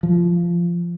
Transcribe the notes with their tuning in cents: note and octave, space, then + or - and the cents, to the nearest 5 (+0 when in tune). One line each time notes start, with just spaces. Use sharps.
F3 -15